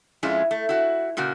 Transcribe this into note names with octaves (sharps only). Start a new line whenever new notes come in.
F2 G#3 C#4 E4 F4
A3
E4 F#4
A#2 C#3 A#3 F#4